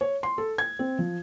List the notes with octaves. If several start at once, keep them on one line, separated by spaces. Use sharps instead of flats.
C#5
C6
A4
G#6
C4
F3